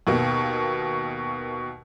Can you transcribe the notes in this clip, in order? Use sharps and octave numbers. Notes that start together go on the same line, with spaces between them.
D#2 B2 A#3